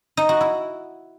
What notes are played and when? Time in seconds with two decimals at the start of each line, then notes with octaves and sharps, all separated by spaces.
0.17 D#4
0.29 F#4
0.41 E4